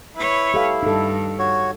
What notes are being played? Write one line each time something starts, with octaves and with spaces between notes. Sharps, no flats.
E4 B4 C#5
G4 A4 F5
G2 D#4 A4
F#4 C#5